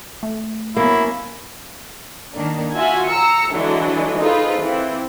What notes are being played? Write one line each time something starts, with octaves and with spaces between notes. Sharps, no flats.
A3
F#3 A#3 B3 C#4 E4
D#3 A#3 D4
F4 F#4 E5 G#5
A#5 E6 C#7
D3 E3 F#3 G#3 D4
D#4 F4 G#4 A4 B4 C5
E3 C4